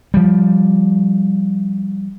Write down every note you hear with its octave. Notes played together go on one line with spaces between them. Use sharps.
F3 G3